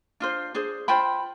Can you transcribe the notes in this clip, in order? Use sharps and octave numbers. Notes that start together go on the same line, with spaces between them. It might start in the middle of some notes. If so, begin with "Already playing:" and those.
D4 F4 C5
D4 G#4 C5
F4 C5 G5 B5